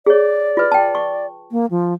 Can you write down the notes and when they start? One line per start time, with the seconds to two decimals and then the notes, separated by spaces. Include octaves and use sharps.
0.06 G#4 C#5 D5
0.57 F4 B4
0.72 G5 A5
0.95 C#6
1.52 A#3
1.71 F3